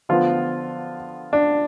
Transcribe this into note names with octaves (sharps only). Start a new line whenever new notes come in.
D3 F3 B3 F4
D4